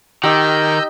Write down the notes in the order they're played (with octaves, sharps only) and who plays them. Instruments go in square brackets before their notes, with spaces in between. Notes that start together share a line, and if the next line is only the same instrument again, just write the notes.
[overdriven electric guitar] D#3 [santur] D#4 G4 [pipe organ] D#5 E6 G6